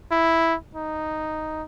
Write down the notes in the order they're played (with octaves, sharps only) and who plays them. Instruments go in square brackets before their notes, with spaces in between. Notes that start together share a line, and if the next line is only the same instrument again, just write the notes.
[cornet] E4
D#4